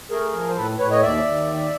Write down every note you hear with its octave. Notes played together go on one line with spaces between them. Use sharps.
A3 G#4 A#4
F3
C5
A2 A4 B4
A2 B4 C#5
C#5 D#5
D#2 D5 E5
D#2
D#3